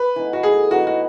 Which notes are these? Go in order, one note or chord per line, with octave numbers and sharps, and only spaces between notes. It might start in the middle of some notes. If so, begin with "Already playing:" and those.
Already playing: B4
E3 B3 D#4
F#4
A2 G#4
E3 B3 D#4 F#4
F#4